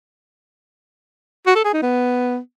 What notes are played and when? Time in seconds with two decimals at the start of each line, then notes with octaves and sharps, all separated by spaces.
1.47 F#4
1.55 A4
1.64 G#4
1.73 D#4
1.82 B3